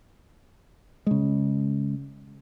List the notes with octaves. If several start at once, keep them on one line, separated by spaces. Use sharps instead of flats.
C#3 G#3